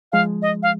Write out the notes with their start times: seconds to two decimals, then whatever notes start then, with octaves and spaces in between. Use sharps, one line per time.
0.12 F3 G#3 F5
0.42 D#5
0.63 F5